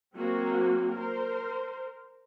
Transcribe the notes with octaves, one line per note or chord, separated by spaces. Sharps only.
F#3 A#3 C4 F#4
A#4 C5